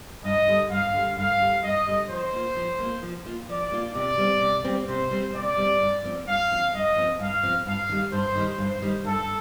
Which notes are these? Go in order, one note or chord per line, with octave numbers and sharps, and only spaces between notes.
G2 D#5
D3 G3
G2 F5
D3 G3
G2 F5
D3 G3
G2 D#5
D3 G3
F3 C5
A#3 F4
F3
A#3 F4
F3
A#3 F4
F3 D5
A#3 F4
C3 D5
G3 C4
C3
G3 C4
C3 C5
G3 C4
C3 D5
G3 C4
G2
F3 C4
G2 F5
F3 C4
G2 D#5
F3 C4
G2 F5
F3 C4
G2 F5
D#3 G3
G2 C5
D#3 G3
G2 C5
D#3 G3
G2 A4